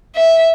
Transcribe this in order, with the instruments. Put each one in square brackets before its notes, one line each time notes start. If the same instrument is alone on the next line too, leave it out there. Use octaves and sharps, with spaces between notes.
[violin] E5